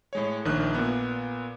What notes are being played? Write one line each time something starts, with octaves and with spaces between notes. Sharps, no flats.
A2 G#3 C#5
A#1 D#3 D4 D#6 F#6
A#2 B3